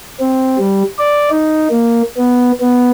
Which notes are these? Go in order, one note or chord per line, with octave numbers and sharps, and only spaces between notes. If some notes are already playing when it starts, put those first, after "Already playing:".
C4
G3
D5
D#4
A#3
B3
B3